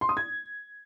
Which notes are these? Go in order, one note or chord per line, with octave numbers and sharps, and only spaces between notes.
C6
D#6
G#6